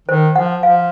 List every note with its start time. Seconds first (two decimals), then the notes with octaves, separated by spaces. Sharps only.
0.08 D#3 C5
0.36 F3 F#5
0.63 F3 F5